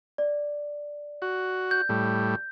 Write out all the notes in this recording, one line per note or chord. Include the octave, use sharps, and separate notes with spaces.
D5
F#4
G6
A2 G3